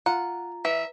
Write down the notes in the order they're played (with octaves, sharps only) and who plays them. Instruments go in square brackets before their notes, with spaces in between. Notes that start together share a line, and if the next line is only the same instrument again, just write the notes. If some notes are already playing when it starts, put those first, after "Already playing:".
[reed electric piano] F4 [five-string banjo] F#5 [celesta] A#5
[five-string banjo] E3 [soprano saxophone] E5